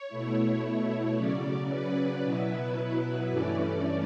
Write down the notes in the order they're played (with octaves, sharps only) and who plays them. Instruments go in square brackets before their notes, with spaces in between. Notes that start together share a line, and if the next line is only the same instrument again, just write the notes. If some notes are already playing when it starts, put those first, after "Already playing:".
Already playing: [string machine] C#5
B2 A3 E4
C#5
C#3 F#3 C#4 D5
B4
B2 F#3 B3 E4
G2 E3 A3 C#4 D5